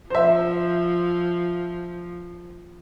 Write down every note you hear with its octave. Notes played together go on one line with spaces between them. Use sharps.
F3 C5 E5